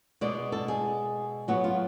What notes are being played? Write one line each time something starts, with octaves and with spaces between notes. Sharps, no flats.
B2 G#3 B3 D5
A4
G#4
A2 F#3 B3 F#4
F4